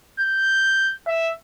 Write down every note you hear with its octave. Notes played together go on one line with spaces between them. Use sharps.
G6
E5